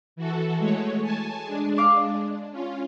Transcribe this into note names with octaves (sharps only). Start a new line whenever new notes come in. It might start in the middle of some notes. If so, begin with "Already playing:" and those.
E3 F#4 A4
G#3 A3 C#5
G#5 A5
G#3 D4
F5 D6
C#4 F4